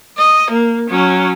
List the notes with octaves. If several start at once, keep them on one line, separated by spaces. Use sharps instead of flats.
D#5
A#3
F#3 C#4